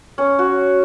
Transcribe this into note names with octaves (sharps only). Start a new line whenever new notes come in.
C#4
F#4